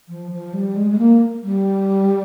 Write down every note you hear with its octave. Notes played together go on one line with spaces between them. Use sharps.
F3
F3
G3
G#3
G#3
A#3
G3